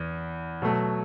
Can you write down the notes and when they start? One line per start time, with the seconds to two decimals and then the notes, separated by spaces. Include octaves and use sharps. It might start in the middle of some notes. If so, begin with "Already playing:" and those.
Already playing: E2 E3
0.62 B2 F#3 A3